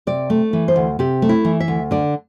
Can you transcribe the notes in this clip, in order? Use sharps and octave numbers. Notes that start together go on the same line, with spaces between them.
C3 D5
A3
E3
C5
D2
C3 G4
A3
E4
E3
E5
D2
D3 D5